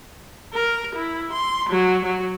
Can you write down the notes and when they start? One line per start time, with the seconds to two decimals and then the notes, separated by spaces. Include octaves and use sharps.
0.54 A#4
0.96 E4
1.33 C6
1.70 F#3
2.05 F#3